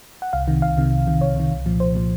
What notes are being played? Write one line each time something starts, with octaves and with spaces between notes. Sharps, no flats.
F#5
C2 F5
C3 D#3
C2 F5
C3 D#3
C2
C3 D#3
C2 C#5
C3 D#3
C2
A#2 F3
C2 C5
A#2 F3